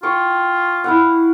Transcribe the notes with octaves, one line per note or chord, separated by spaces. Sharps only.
F4 G5 C#6
E4 F5 F#5